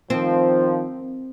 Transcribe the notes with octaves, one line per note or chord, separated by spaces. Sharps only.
D#3 F3 C4